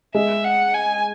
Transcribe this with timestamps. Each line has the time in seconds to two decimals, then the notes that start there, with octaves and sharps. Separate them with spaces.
0.15 G#3 E5
0.45 F#5
0.74 G#5